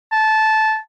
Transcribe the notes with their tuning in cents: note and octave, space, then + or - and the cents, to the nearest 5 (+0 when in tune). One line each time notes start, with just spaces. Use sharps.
A5 -15